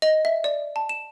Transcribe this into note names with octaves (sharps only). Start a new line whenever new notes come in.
D#5
E5
D5
A5
E7